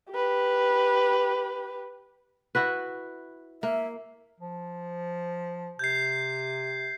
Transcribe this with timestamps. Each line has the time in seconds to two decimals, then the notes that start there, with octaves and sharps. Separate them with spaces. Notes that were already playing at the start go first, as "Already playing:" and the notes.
0.10 G4 B4
2.55 E4 F#4 B4
3.63 A#3 E5
4.41 F3
5.79 C3 G6 G#6 C7